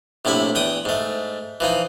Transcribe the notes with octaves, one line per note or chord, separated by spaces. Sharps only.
A#1 A2 C3 E4 B5
E2 G5 D#6
G#2 A3
E3 F3 D#4